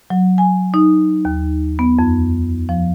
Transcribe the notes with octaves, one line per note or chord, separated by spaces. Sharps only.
F#3
G#5
D#4
D#2
B3
F2
F3